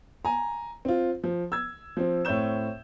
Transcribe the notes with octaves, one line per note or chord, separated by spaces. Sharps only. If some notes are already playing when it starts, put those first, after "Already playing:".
G#5 A#5
C4 F4
F3
E6 G#6
F3 C4
A2 C4 C#5 G6 E7